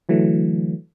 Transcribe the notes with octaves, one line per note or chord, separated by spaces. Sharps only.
D3 E3 F#3 A3